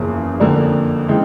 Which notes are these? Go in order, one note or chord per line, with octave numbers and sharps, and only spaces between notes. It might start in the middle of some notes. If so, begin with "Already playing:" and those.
Already playing: F#1 E2 C#3 F3 A#3
F2 D3 F3 A#3 D4
C#3 E3 G#3 C4